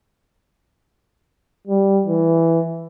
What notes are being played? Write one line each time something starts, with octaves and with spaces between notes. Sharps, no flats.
G3
E3